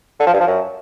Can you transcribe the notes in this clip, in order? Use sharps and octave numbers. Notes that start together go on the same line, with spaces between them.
D3
F3
G2
F3
F#2